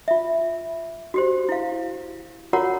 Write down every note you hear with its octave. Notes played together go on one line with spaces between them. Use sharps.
F4 E5
F#4 G4 C5
E4 F5
F4 F#4 A#4 C#5 F#5 A#5